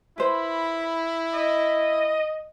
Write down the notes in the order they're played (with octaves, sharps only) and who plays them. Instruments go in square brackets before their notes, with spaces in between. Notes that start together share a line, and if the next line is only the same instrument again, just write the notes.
[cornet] E4 [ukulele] B4 C5 [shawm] B5
[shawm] D#5